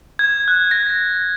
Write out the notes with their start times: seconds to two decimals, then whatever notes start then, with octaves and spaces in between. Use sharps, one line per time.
0.19 G#6
0.48 F#6
0.71 A#6